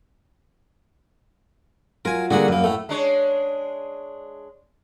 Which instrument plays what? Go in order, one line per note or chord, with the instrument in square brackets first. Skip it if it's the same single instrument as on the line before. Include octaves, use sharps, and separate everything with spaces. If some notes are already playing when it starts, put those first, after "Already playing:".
[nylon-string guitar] F#3 F4 [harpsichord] A#4 G#5
[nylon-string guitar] D3 G3 A#3 [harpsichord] F#4 G#4 F#5
[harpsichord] F#2 A#3 [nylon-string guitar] B3
[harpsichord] A2 A3
[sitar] G#3 D4 C#5